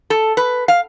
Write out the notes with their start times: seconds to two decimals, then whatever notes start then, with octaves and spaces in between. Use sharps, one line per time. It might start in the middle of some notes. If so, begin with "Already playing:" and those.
0.10 A4
0.37 B4
0.68 F5